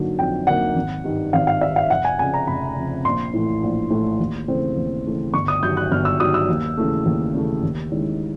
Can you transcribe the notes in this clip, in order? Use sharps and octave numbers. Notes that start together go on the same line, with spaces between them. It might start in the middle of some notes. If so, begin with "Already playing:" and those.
Already playing: D3 F#3 A#3 D#4
F2 G5
D3 F#3 A#3 D#4 F#5
G#1
G2 D#3
G#1 F5
F5
G2 D#3 E5
F5
F1 F#5
G#5
F2 C#3 G#5
A#5
F1 B5
F2 C#3
A#1 C6
A2 E3 A3
A#1
A2 E3 A3
D#2
C#3 E3 A3 C4
D#2
C#3 E3 A3 C4
G1 C#6
D#6
G2 D#3 F#3 G6
F#6
G1 F6
E6
G2 D#3 F#3 D#6
E6
D#2
C#3 E3 A3
D#2
C#3 E3 A3
D#2
D#3 G#3 C#4 E4